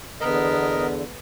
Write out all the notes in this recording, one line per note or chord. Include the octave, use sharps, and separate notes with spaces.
E2 D3 B3 A#4 D#5